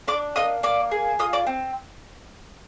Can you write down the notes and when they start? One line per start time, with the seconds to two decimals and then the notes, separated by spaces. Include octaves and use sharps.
0.08 D4 D5 D6
0.36 A#3 D#5 D#6
0.63 A#3 D5 D6
0.91 G#4
1.19 F4 D#5 D#6
1.33 D5 D6
1.47 C4